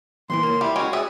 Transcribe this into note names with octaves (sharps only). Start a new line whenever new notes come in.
E2 A#2 E3 C6
C#2 A#3
G3 E4
G#3 C#4 F#4 G5
G#4 E5